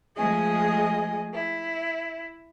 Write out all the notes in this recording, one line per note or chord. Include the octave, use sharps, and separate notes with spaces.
F3 G#3 A3 G#4 D#5 G#5
E4